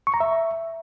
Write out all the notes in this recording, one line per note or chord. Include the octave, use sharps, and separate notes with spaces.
C#6
A#5
E5